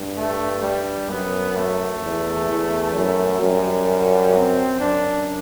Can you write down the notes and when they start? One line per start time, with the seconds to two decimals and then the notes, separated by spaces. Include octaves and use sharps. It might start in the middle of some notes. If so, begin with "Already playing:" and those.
Already playing: G2
0.17 A3
0.62 G3
1.09 F#2 B3
1.56 A3
2.02 E2
2.48 E2
2.95 F#2
3.41 F#2 G3
4.34 C4
4.80 F#2 D4